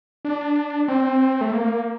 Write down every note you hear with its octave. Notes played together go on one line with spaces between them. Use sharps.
D4
C4
A3
A#3